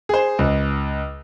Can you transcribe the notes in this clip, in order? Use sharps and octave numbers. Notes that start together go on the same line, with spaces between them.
G#4 C5
C#2